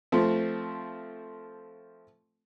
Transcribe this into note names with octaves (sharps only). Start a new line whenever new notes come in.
F3 A3 C4